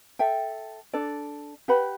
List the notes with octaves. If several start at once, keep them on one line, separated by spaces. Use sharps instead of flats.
A4 E5 G5
D4 A4 D5
G4 B4 F#5 B5